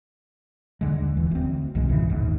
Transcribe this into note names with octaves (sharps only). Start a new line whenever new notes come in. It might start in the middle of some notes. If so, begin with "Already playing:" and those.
D#2 D3 G#3
D#1 E3
D2 C4
B1 G2 D#3 G#3
A#2 C#3 E3
G#1 D#2 G#2